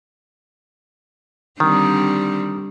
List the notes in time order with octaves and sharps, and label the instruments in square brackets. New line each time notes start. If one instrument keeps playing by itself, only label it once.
[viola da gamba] D3 G3 C4 [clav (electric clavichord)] D#3